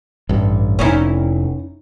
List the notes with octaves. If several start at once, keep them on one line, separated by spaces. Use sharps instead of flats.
A1 G2
F1 C#4 D#4 E4